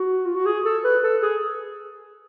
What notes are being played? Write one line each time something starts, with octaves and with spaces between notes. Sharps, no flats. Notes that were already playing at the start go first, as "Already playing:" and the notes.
Already playing: F#4
F4
F#4
G#4
A4
B4
A4
G#4